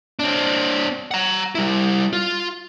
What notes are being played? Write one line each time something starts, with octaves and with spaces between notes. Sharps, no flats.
C4 D4
F#5 A#5
G3 E4
F4